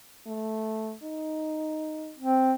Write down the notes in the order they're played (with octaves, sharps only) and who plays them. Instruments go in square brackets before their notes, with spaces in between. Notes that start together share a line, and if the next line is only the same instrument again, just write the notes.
[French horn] A3
D#4
[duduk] C4